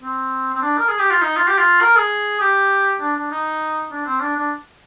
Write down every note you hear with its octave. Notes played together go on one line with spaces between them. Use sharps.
C4
C4
D4
A#4
G#4
G4
F4
D#4
F4
G4
F4
A#4
G#4
G4
D4
D4
D#4
D4
C4
D4
D4